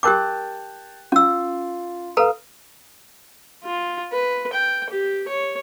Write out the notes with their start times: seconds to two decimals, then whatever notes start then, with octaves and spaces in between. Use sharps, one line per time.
0.03 G4 A#4 G5 A5 D6 F#6
1.12 C#4 F4 E6
2.17 A4 B4 F5 A#5 D#6
3.64 F4
4.12 B4
4.53 G5
4.90 G4
5.28 C#5